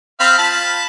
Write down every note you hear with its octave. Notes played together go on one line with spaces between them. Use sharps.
C4 F5 B5
F4 A5 B5